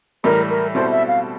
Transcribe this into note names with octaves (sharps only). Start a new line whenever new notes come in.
A2 E3 G3 A#4
A#4
B2 G3 C4 E4 A4 C5
E5
F5